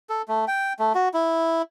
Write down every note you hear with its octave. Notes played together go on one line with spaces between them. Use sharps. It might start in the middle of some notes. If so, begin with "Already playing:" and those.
A4
A3
G5
A3
F#4
E4